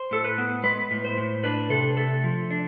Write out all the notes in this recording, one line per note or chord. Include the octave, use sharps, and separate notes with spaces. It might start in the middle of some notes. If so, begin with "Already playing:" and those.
Already playing: C5
A2 A4
B4
B3
G#3 B4
A2
C5
A2
D4 B4
C3 A4
A3 A4
F3
D4